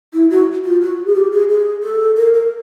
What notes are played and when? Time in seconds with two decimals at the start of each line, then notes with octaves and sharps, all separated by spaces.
0.13 E4
0.30 F#4
0.64 F4
0.81 F#4
1.06 G#4
1.15 G4
1.32 G#4
1.49 G#4
1.83 A4
2.17 A#4
2.34 A#4